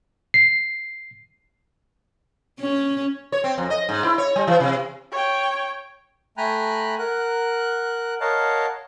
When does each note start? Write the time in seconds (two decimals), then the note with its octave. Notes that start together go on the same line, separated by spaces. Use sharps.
0.34 C7
2.60 C#4
3.32 C#5
3.44 C4
3.58 F2
3.70 D#5
3.89 G#2
4.04 E4
4.18 C#5
4.36 G3
4.47 E3
4.60 C3
5.12 C#5 G5
6.37 A3 G5 G#5 A#5 B5 F#6
6.98 A#4 F#5 F#6
8.21 A#4 C#5 D#5 F5 F#5 A5